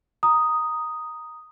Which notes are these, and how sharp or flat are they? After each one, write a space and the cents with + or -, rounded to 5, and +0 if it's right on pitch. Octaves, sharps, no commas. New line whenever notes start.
A#5 +5 D#6 +0